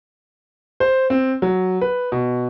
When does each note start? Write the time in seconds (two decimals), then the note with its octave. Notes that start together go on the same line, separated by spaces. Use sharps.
0.80 C5
1.10 C4
1.42 F#3
1.81 B4
2.12 B2